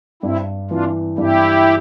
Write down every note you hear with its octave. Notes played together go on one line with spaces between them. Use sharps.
G2 C4 E4
E3 D4 F4
G2 E4 G4